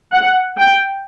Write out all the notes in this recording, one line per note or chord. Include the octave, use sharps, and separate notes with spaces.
F#5
G5